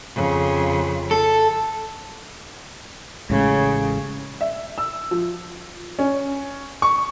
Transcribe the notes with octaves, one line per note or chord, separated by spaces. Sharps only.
F2 C#3
A4
A1 A2 C#3 G#3
E5
E6
F3
C#4
C#6